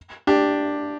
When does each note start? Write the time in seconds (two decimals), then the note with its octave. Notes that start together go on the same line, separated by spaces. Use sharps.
0.27 D4 G4